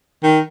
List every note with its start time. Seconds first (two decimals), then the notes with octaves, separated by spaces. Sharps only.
0.23 D#3